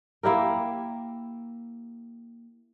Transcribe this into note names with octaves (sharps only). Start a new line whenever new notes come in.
A#3 E4 G4 A#4